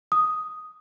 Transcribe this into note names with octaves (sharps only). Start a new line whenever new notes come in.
D#6